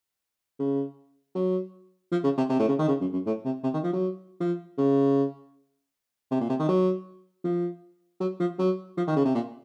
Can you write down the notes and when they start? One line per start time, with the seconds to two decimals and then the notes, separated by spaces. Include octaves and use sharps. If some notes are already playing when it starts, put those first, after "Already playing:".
0.60 C#3
1.35 F#3
2.12 F3
2.24 C#3
2.38 C3
2.49 C3
2.60 A2
2.69 C#3
2.79 D#3
2.88 C#3
3.01 F#2
3.13 F#2
3.26 A2
3.45 C3
3.64 C3
3.74 D#3
3.84 F3
3.93 F#3
4.41 F3
4.78 C#3
6.31 C3
6.41 A#2
6.49 C3
6.59 D#3
6.68 F#3
7.44 F3
8.21 F#3
8.40 F3
8.59 F#3
8.98 F3
9.07 D#3
9.17 C#3
9.25 C3
9.35 A#2